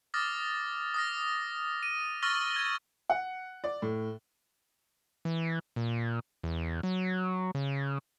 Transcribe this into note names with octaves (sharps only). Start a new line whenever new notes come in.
D6 D#6 F6 A6 A#6
D#6 F6 A#6
D#7
C#6 E6 F6 A6 A#6 G7
G#6
F#5
D5
A2
E3
A#2
E2
F#3
C#3